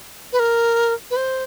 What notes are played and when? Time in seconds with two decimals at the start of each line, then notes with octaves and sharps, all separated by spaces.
0.33 B4
0.39 A#4
1.11 B4
1.16 C5